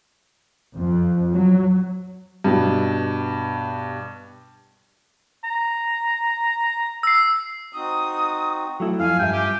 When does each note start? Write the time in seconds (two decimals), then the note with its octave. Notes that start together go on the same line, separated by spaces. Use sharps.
0.74 F2
1.31 F#3
2.44 G2 B2
5.44 A#5
7.03 E6 C7
7.73 C4 D#4 F#4 D#6
8.80 F#3 A3 E4
9.00 F2 F4 F5 G#5
9.19 G2 E5 G5
9.33 G4